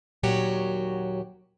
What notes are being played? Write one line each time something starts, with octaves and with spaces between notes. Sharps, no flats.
D#2 A#2 F#3 F#4 G4 C#5